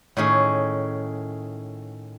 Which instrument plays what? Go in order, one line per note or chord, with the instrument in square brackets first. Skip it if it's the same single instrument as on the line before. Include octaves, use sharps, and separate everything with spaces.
[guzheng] A2 D#3 C#4 G#4